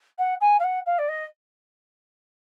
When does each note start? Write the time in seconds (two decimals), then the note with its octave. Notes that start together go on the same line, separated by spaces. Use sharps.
0.18 F#5
0.41 G#5
0.59 F5
0.64 F#5
0.86 F5
0.98 D5
1.08 D#5